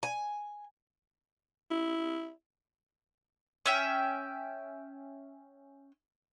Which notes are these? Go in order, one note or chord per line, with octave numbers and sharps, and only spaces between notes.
G#5
E4
C#4 E5 G5